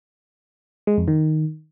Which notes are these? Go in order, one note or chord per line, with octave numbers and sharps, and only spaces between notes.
G#3
F2
D#3